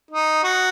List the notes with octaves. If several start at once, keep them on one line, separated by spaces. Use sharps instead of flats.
D#4
F#4